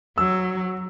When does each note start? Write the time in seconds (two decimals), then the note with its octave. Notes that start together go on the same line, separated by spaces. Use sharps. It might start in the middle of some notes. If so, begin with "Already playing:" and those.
0.18 F#3 E6